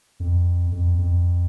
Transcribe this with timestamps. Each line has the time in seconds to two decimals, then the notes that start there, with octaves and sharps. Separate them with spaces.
0.20 F2
0.72 F2
0.98 F2